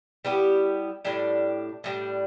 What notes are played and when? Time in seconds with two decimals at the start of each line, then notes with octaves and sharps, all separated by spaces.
0.25 G3 B3 E4 G4
1.05 A2 G3 D4
1.84 A2 G3 D4